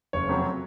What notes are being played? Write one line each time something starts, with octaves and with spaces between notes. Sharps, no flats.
F#1 C#5
F2 C3 F#3 C4